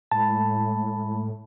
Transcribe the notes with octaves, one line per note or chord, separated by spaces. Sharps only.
A2 G#3 A5 B5